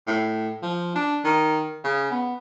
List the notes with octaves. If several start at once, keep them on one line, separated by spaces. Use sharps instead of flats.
A2
F3
D4
D#3
C#3
B3